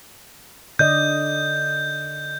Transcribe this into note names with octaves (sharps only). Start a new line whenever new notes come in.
D3 D5 D#5 G6